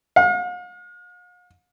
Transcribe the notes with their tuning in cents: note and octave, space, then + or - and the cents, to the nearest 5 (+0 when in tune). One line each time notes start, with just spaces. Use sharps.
F5 +45